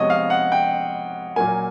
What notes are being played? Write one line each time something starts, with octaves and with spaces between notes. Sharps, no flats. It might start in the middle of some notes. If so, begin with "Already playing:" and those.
Already playing: C3 F3 G#3 B3 C#5 D#5
F5
F#5
G5
A#2 F#3 A#3 G#5